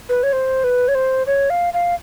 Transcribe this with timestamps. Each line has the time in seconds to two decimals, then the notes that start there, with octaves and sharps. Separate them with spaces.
0.09 B4
0.23 C#5
0.33 C5
0.64 B4
0.88 C#5
0.95 C5
1.27 C#5
1.50 F5
1.74 F5